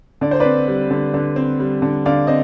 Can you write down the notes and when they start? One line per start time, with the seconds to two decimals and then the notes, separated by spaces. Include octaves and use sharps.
0.21 D3 D5
0.31 C5
0.40 C4 B4 D5
0.68 G3
0.91 D3
1.14 D3
1.36 C4
1.60 G3
1.82 D3
2.06 D3 D5 F5
2.27 C4 D#5